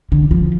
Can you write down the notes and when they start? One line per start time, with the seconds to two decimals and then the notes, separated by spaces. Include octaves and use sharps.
0.12 D3
0.31 F3